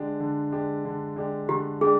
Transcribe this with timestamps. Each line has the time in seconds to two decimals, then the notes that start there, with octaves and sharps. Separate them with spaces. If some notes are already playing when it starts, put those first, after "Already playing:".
Already playing: D3 G#3 D4 G4
0.20 D3
0.52 G#3 D4 G4
0.85 D3
1.16 G#3 D4 G4
1.49 D3 G4
1.81 G#3 D4 G4 G#4